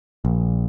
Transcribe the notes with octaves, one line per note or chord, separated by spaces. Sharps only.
A#1